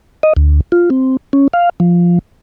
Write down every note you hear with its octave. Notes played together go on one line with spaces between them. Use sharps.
D#5
D2
F4
C4
C#4
F5
F3